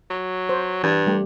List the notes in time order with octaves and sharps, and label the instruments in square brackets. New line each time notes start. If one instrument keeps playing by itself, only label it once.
[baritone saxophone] F#3
[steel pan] C5
[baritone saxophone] G2 [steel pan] E3
[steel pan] G3 A3 G4